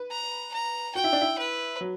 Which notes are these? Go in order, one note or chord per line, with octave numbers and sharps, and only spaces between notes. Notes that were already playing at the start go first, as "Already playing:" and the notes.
Already playing: B4
A#5
A#5
F#4 G5
E4
D4
E4
B4
F#3